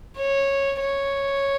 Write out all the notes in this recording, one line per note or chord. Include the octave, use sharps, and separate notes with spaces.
C#5
C#5